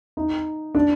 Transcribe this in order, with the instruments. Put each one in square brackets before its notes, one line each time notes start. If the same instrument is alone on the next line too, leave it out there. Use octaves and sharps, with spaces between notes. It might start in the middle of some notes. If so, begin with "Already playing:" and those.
[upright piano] D#4
D4